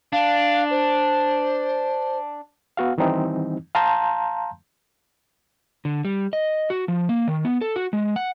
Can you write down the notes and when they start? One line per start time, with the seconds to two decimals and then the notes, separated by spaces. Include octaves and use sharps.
0.13 D4 F5
0.71 C5
2.77 B3 F#4 F5
2.98 D#3 E3 G3 C4 D#4
3.75 F5 A5 A#5 C6 G6
5.85 D3
6.05 G3
6.33 D#5
6.70 F#4
6.88 F3
7.09 A#3
7.28 D#3
7.45 B3
7.61 A4
7.76 F#4
7.93 G#3
8.16 F#5